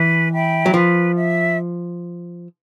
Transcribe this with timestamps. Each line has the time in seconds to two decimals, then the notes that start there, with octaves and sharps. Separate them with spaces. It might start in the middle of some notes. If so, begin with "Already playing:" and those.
Already playing: E3 B4
0.33 E5 G5 B5
0.66 F#3
0.74 F3 B4
1.15 E5